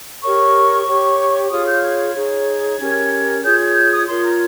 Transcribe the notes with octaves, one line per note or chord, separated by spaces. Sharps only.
G4 A#4 C#5 C#6
G4 C#5
F4 G#4 C#5 D#6
G6
G#6
G#6
D#4 G#4 C#5
C#4 G4 A#4 C#5
F4 G#4 C#5 G6
G#6
G6
D#6
F4 A#4 C#5 C6
A#5